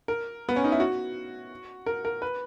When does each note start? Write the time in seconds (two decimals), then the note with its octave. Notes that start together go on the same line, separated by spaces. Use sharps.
0.08 A#4
0.49 B3
0.56 C#4
0.64 D#4
0.72 E4
0.80 F#4
1.86 A#4
2.05 A#4
2.22 B4